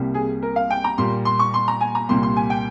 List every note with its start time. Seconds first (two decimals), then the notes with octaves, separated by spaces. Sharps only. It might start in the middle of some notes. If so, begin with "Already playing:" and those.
Already playing: C2 C3 G3 A#3
0.14 G#4
0.43 A#4
0.56 F5
0.70 G5
0.84 A#5
0.98 A#2 G3 A#3 C6
1.25 C6
1.39 C#6
1.54 C6
1.68 A#5
1.81 G#5
1.95 A#5
2.09 C2 A#2 G3 A#3 C6
2.23 C6
2.37 G#5
2.50 G5